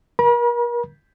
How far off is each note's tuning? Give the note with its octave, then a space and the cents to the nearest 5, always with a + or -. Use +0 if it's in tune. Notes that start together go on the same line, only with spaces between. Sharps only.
A#4 +40 B5 -45